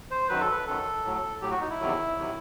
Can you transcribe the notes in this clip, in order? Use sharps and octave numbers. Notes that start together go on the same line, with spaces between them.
C5
F#2 D#3 F#3 B4
A4
B4
F#2 D#3 F#3 A4
A2 F#3
A2 F#3 G4
F#4
D#4
E4
E2 C3 D#3 F#3
C3 D#3 F#3